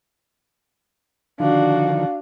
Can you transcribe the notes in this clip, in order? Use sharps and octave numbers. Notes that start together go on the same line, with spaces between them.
D3 D#3 F3 D4 F#4 F5